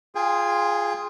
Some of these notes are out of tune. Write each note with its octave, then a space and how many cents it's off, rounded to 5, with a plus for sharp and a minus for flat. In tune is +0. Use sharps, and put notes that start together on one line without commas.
F4 +0 G#4 +0 G5 +35